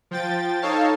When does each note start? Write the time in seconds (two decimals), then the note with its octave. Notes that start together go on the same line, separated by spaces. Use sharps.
0.11 F3 G5 A6
0.62 D#4 A4 C#5 F5 A5